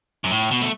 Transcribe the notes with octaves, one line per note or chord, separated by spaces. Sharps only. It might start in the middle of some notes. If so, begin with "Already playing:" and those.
F#2
A2
B2
A3